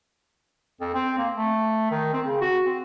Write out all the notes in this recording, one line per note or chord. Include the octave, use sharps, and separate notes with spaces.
F2
C4
A#3
A3
D#3
C4
C#3
F#4
C4